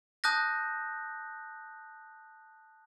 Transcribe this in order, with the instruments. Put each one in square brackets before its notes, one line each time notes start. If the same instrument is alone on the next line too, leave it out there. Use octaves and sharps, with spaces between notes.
[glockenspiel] A5 D#6 F#6 G6 A#6